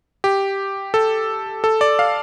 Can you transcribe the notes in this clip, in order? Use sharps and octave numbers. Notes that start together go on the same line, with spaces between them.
G4
A4
A4
D5
F5